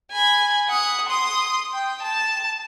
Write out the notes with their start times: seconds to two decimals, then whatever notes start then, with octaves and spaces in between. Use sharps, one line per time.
0.11 G#5 B5
0.69 F#5 D#6
1.09 C6 D#6
1.73 G5
2.02 A5